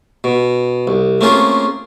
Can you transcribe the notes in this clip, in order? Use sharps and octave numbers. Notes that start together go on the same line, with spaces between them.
B2
C2
A3 A#3 C4 C#4 F4 G#4